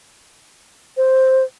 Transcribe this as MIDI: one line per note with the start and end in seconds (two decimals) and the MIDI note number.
0.97 1.44 72